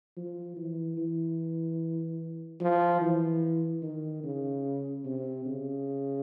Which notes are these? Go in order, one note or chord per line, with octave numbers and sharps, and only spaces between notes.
F3
E3
E3
F3
E3
D#3
C#3
C3
C#3